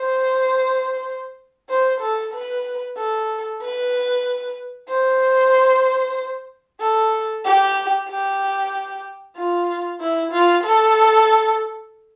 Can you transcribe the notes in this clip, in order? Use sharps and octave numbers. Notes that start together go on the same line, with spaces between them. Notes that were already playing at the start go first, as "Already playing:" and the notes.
Already playing: C5
C5
A4
B4
A4
B4
C5
A4
G4
G4
F4
E4
F4
A4